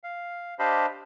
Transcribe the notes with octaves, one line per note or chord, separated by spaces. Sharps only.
F5
D4 G4 C5 D#5 F5 B5